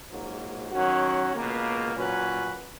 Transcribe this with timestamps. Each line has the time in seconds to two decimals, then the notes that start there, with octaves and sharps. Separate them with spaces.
0.10 A#1 G#2 F#3 A#3
0.72 D#3 F#3 C#4 F#4
1.33 C#2 B2 A#3
1.95 A#2 F#3 C#4 F#4 B4